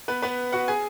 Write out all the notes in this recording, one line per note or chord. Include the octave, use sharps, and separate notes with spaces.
B3 B4
B3 B4
F#4 F#5
G#4 G#5